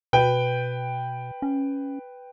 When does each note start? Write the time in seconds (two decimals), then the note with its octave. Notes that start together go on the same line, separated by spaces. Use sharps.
0.13 B2 B4 G5
1.42 C#4